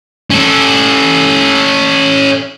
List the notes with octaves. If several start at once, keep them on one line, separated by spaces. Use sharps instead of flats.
C#4 A4